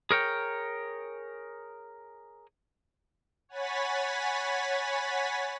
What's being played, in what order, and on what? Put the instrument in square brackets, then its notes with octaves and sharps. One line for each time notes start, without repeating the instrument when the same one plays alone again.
[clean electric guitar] G#4 A#4 C#5 G5
[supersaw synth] C#5 F#5 G#5 B5 A6 B6